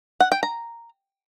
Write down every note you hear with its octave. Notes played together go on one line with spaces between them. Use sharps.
F#5
G5
A#5